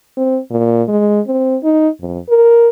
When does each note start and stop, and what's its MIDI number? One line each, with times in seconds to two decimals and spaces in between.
0.17 0.39 60
0.51 0.83 46
0.88 1.20 56
1.27 1.56 60
1.63 1.89 63
2.01 2.19 41
2.29 2.70 70